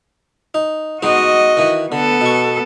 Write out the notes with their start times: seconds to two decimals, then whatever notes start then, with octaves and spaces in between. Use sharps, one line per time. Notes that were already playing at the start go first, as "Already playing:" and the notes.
0.54 D#4
1.03 G#3 B3 D#4 F#4 D#5
1.57 D#3 E3
1.92 D3 B3 A4
2.21 B2 C#6